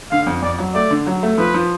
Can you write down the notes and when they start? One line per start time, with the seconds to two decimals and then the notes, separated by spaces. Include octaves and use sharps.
0.11 D3 F5
0.27 F2
0.42 F2 D5
0.59 F#3
0.74 A3 D5
0.91 D3
1.07 F#3
1.23 A3
1.38 F3 B4
1.54 F3